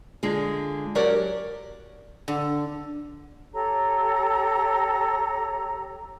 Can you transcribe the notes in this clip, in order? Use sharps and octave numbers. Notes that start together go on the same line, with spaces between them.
D3 G#3 F4 G#4
F#3 G4 A#4 C#5 D5 F#5
D3
G4 A4 C#5 A#5